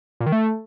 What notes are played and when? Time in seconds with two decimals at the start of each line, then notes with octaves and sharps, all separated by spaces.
0.20 A#2
0.26 D#3
0.32 A3